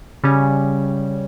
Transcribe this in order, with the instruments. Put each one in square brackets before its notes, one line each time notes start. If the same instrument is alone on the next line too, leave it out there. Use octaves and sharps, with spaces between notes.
[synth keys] C#3 G3 C#4